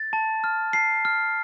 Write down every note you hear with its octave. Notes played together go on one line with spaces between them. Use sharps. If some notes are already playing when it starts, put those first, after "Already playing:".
Already playing: A6
A5
F6
A5 C7
F6